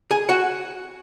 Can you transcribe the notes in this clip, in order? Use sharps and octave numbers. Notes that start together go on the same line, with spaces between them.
G#4 G#5
F#4 F#5